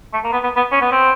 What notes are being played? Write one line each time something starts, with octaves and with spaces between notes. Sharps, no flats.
A3
A#3
B3
B3
B3
C#4
B3
C4